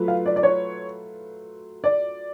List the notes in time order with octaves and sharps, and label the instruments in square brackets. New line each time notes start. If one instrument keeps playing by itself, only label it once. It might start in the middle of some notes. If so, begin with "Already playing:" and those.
Already playing: [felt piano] F#3 A3 F4 B4
[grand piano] F5
D5
D5
C#5
D5